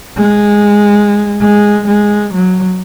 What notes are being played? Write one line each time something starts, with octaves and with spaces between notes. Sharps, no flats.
G#3
G#3
G#3
F#3